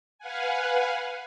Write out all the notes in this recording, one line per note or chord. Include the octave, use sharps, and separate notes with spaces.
B4 F5 F#5 G#5